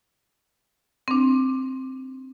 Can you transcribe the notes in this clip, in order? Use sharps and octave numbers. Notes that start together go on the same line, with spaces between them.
C4 D4